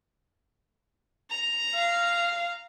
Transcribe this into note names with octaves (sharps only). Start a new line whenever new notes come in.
A#5
F5